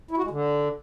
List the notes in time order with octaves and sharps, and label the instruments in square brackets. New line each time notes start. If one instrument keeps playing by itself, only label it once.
[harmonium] E4
F#4
G#3
D3